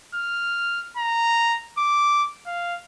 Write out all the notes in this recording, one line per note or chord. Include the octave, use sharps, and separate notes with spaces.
F6
A#5
D6
F5